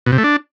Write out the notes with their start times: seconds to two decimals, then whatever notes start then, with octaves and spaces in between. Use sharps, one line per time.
0.06 B2
0.12 C3
0.18 A3
0.24 D4